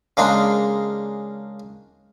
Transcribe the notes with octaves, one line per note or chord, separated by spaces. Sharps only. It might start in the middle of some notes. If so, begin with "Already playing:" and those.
C#3 G#3 A#3 D4 D#4 F4